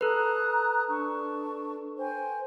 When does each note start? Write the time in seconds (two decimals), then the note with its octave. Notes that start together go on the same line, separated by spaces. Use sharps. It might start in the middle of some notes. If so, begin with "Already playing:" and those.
0.01 A4 B4 A#5 D#6 F#6
0.89 D4 A5 C#6
1.98 C5 G5 G#5